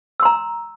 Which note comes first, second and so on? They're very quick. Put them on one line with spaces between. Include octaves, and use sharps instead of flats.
E6 C6 A#5